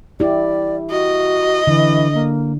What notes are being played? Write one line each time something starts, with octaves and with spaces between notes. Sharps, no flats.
E4 G4 D5
F#4 D#5
D3 E3
A#3